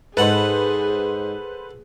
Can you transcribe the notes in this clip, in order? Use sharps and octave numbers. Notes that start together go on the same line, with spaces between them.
G#2 G#4 A4 B4 C5 F#5